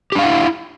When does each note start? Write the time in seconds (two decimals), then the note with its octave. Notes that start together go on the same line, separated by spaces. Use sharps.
0.12 G4
0.15 D4
0.19 F5
0.22 F#5
0.25 E4